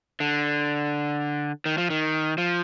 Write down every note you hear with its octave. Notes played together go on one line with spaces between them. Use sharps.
D3
D#3
F3
D#3
F3